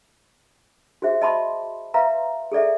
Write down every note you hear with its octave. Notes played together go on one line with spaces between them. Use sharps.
F#4 G#4 C5 E5
D#5 E5 A5 B5 C6 D6
B4 E5 F5 A#5 C6
G#4 A4 D5 E5